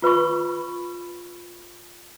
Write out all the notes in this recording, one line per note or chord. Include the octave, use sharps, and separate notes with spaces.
F4 B4 B5 C#6